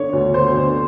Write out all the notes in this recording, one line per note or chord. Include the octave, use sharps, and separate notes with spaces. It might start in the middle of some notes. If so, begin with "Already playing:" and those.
Already playing: D3 C#5
D2
D2 C5
D3